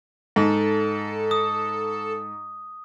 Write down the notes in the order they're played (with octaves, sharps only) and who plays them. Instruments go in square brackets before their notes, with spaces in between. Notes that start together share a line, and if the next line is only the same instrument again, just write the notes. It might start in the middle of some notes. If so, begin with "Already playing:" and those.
[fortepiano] G#2 [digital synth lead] A4
[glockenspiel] D#6